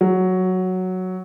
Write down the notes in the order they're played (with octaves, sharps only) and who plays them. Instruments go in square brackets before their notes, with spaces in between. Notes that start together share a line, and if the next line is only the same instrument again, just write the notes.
[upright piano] F#3